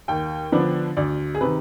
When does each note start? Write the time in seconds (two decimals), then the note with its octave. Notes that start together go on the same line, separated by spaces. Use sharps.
0.08 D#2 G5
0.52 D3 F3 B3 D4
0.97 D2 D5
1.35 G#4
1.41 C3 D#3 B4